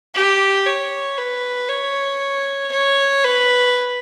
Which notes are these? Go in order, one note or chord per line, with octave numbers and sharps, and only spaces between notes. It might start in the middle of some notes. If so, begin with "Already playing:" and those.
G4
C#5
B4
C#5
C#5
B4